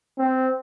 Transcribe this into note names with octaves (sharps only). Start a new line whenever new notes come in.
C4